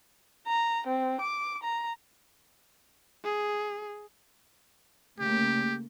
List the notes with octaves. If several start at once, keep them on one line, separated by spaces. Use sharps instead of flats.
A#5
C4
D6
A#5
G#4
C#3 A3 A#3 G4